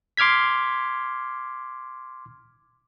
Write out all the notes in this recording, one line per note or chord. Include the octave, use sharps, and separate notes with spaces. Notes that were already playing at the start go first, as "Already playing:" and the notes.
C6 D6 F6 G#6 B6